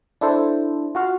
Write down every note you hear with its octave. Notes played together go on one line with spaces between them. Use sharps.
D4 E4 A4 C5
F4 F#4 F5